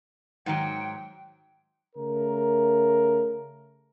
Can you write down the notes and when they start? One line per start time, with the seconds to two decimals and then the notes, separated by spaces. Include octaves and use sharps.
0.46 G#2 D#3 F#3 G5
1.96 C#3 A3 A#4